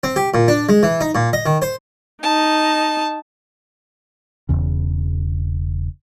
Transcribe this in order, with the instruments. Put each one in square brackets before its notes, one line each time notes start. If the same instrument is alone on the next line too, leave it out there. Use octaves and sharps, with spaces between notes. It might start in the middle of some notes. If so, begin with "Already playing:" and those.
[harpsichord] C4
G4
A#2
D4
G#3
E3
D#4
A#2
D#5
D#3
C5
[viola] D#4 [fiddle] A5
[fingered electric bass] E1 A#1 E2 C#3